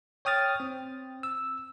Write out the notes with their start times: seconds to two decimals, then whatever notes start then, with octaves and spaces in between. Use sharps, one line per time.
0.25 C#5 G5 D#6 F6 A6
0.60 C4
1.23 E6